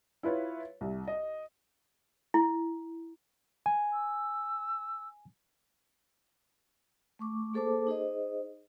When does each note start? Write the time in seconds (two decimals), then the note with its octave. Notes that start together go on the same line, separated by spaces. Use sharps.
0.23 E4 F4 B4 C#5 E5
0.81 C2
1.07 D#5
2.34 E4
3.66 G#5
3.93 E6
7.19 A3 C#6 D6
7.54 A#3 G#4 A4 C5 A5 D6
7.87 D#4 G#4 C5 D#5